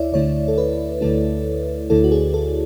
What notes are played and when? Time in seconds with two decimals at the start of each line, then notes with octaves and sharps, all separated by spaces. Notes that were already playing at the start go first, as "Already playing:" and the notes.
Already playing: D2 E4 C#5 D5 E5
0.12 D2 D3 A3 E4 C#5
0.48 A4
0.58 B4
1.01 D2 D3 A3 E4 A4
1.90 D2 D3 A3 E4 A4
2.04 F#4
2.12 G#4
2.34 A4